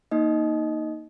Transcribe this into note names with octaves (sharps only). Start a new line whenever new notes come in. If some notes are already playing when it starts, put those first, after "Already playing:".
A#3 D#4 D#5